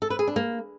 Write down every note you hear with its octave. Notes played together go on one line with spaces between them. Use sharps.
A4
B4
G#4
D4
A#3